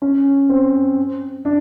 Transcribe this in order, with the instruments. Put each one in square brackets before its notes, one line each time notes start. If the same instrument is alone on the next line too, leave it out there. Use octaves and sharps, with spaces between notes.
[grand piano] C#4
C4
D4